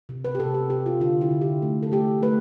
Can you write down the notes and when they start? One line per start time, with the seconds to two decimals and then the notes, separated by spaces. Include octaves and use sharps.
0.09 C3
0.24 B4
0.35 G4
0.40 C3 A4
0.54 G4
0.70 C3 G4
0.86 F4
1.00 D3 F4
1.21 E4
1.31 D3
1.41 G4
1.62 A3
1.83 A4
1.92 A3 G4
2.23 A3 B4